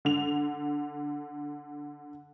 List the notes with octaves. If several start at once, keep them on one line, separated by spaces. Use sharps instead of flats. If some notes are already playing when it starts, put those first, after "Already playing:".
D3 F7